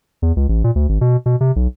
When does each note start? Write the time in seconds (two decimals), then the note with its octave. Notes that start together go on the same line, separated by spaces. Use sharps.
0.22 E2
0.36 C#2
0.49 A1
0.64 A#2
0.75 D2
0.89 G#1
1.01 B2
1.26 B2
1.41 C3
1.56 B1